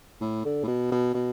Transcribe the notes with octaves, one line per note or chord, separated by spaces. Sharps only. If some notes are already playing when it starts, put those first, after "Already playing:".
A2
D3
A2
B2
B2
B2